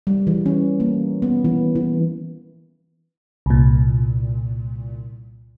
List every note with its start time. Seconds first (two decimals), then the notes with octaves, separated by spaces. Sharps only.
0.07 G3
0.27 E3
0.46 C#4
0.80 A#3
1.22 B3
1.44 E3
1.75 E3
3.46 C2 A#2